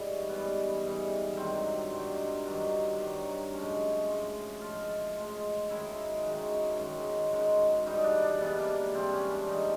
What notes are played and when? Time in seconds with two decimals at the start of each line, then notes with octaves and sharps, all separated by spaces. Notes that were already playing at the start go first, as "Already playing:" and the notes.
Already playing: G#2 E3 G3 C#4
0.29 G#2 E3 G3 B3
0.83 G#2 E3 G3
1.37 G2 D#3 F#3 C4
1.92 G2 D#3 F#3
2.46 G2 D#3 F#3
3.00 G2 D#3 F#3
3.54 A2 F3 G#3 C#4
4.08 A2 F3 G#3
4.61 A2 F3 G#3 F4
5.16 A2 F3 G#3
5.69 F#2 D#3 G#3 E4
6.24 F#2 D#3 G#3
6.78 F#2 D#3 G#3
7.32 F#2 D#3 G#3
7.86 G#2 E3 G3 D#4
8.04 D4
8.22 D4
8.40 G#2 E3 G3 B3
8.58 A#3
8.94 G#2 E3 G3 C4
9.13 C#4
9.31 D4
9.49 G#2 E3 G3 D#4